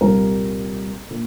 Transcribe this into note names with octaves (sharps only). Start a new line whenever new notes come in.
C2 A#2 G3 A#3 A#4
A#2